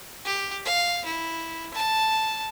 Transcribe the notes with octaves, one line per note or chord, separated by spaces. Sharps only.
G4
F5
E4
A5